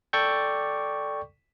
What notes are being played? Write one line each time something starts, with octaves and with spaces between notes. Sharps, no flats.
A4 D5 G5 C#6 D6 G6